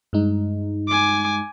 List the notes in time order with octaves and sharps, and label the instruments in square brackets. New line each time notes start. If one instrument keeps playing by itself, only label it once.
[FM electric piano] G2 G#3 D#4
[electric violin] G#5 D6